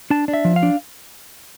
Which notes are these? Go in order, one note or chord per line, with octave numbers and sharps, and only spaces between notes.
D4 A5
D4
E5
F3
F5
D4